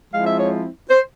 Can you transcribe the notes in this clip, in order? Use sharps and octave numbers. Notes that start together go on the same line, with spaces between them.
F3 G#3 C4 E4 F5
E5
C#5
C5